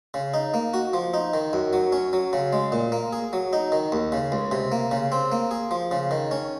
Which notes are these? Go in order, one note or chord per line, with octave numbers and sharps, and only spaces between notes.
C#3
D#4
A#3
F#4
F3
D#4
D#3
F#2
F#3
C#4
F#3
C#3
G#3
A#2
A#3
G#4
F#3
D#4
D#3
D#2
C#3
C#2
C3
A#3
C#3
C4
A#3
G#4
F3
C#3
D#3
C#4